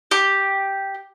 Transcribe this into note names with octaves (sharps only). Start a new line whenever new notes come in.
G4